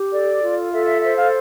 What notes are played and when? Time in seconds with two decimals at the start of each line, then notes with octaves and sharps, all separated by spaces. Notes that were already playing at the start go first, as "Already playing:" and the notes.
Already playing: G4
0.12 A4 D5
0.41 F4
0.72 A4 E5
0.87 E5
1.02 C5 E5
1.18 F5